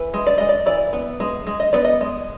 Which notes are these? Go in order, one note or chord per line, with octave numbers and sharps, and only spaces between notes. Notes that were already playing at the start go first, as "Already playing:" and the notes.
Already playing: E3 B4
G#3
D5
G#3 D#5
D5
E3 D5
B3
G#3
G#3
D#5
B3 D5
D#5
G#3